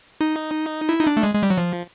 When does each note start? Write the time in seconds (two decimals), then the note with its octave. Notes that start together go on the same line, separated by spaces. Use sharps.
0.21 D#4
0.89 E4
1.00 D#4
1.07 D4
1.17 A3
1.23 G#3
1.35 G#3
1.43 G3
1.50 F#3
1.58 F3